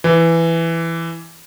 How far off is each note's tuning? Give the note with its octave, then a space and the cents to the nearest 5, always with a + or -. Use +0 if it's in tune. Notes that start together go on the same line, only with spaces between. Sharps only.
E3 +10